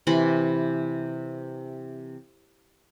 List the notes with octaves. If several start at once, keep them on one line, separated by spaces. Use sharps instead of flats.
C3 E3 B5 C6